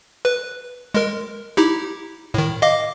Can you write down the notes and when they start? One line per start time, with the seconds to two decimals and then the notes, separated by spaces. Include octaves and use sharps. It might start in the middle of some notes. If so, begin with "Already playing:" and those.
0.25 B4
0.94 G#3 A#4
1.57 D#4 E4 G4
2.34 A2 D#3
2.62 D#5 F5 D6